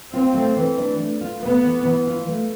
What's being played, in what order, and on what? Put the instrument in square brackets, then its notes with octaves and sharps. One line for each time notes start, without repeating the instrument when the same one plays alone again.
[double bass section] C4 [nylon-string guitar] F4
[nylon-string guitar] A3
E3
D4
A3
F4
[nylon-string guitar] A3 [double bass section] B3
[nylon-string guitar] E3
E3
F4
A3